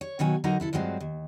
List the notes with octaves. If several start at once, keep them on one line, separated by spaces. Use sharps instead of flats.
C#5
B2 D#3 F#3 G#5
D3 F#3 D#4 A#4 D#5 A#5
C3 E4 A4
G2 F3 F#3 G#3 C4
D#2